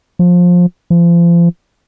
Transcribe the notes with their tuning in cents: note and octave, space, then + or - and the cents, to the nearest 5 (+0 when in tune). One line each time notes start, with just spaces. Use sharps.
F3 +20
F3 -35